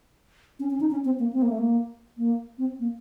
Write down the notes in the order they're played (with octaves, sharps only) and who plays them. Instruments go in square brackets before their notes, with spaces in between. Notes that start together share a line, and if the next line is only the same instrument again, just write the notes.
[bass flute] C#4
C#4
D#4
C#4
C4
A#3
C4
A#3
A3
A#3
A#3
C4
A#3